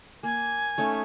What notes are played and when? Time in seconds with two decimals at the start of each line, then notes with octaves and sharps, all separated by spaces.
0.23 A#3 G#5
0.78 A3 C#4 D#4